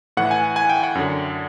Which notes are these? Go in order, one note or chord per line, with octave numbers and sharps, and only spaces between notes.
A2 E3 F#5
G#5
G#5
G5
F#5
F#2 D3